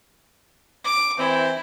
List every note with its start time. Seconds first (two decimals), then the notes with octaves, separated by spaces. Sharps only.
0.84 D6
1.19 E3 C4 E4